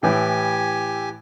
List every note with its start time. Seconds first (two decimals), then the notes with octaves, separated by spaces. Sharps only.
0.03 A2 E3 G4 G5 G#5